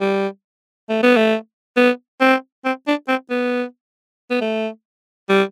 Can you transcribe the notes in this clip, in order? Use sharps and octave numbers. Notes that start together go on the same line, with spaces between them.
G3
A3
B3
A3
B3
C4
C4
D4
C4
B3
B3
A3
G3